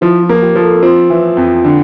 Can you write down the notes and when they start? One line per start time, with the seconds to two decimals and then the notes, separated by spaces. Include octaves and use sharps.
0.01 F3 E4
0.23 F4
0.29 A#3
0.42 G4
0.55 F3
0.62 A4
0.83 C4 F4
1.10 E3
1.37 F2
1.65 D3